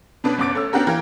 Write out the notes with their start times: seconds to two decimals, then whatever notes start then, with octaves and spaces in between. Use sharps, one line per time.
0.24 B2 C#4 D4 B4
0.38 F#1 B3 C#4 D6 A6 D7
0.55 A3 C#4 E6
0.73 B3 C#4 D4 F#4 G4 A#4
0.87 E3 A#3 G4 A#4